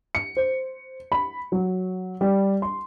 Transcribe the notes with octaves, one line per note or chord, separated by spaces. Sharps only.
C#7
C5
B5
F#3
G3
C6